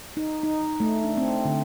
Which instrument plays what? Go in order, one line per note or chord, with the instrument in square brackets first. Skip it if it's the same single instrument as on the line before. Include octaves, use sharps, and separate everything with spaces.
[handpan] D#4
D#4
A3
D4
C4
D3